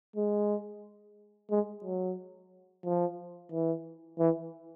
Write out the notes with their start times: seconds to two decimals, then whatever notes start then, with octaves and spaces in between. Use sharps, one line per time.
0.16 G#3
1.50 G#3
1.84 F#3
2.85 F3
3.52 E3
4.19 E3